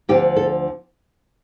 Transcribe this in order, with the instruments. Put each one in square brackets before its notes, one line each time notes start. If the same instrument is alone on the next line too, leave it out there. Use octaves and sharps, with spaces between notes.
[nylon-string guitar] D2 D3 F3 G4
A4